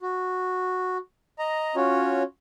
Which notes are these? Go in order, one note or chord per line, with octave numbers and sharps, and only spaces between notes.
F#4
D#5 A#5
C#4 F4 F#4 C#5